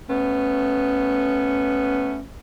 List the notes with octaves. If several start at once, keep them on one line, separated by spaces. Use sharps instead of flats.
A3 B3 C#4